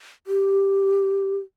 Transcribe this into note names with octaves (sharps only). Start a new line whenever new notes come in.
G4